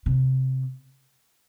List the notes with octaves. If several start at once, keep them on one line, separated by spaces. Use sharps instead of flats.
C3